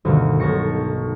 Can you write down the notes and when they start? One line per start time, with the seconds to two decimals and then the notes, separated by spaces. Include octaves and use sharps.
0.05 D2 G2 B2 D#3
0.40 B1 A5 C#6 A#6 C#7